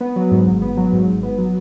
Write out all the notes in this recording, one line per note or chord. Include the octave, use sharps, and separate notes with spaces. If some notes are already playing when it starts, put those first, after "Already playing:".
B3
F#3
G#2
G#1
B3
F#3
G#2
G#1
B3
F#3